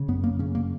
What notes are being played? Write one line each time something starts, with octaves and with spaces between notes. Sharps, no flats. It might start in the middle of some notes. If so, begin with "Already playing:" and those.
Already playing: C#3
F#2 B3
A#3
C#3 C#4
A#3